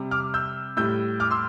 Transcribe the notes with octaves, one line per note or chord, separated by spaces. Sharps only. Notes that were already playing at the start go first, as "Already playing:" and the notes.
Already playing: C3 G3
D6 F6
E6 G6
A2 G3 E6 G6
D6 F6
C6 E6